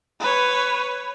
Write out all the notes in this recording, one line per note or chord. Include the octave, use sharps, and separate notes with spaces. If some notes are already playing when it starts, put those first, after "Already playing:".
B4 C#5